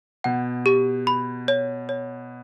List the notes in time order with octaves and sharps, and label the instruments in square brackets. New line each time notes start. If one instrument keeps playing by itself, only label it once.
[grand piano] B2 [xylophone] F#5
[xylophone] G4
B5
C#5
C#5